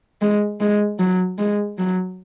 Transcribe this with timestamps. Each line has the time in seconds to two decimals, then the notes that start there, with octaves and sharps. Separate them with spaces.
0.22 G#3
0.60 G#3
0.99 F#3
1.38 G#3
1.78 F#3